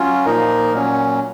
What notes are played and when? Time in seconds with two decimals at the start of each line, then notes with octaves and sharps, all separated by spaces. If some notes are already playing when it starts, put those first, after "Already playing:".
Already playing: F#3 C#4 F4
0.26 A#2 F3 A#3 D#4 A#4
0.73 A#2 F#3 C#4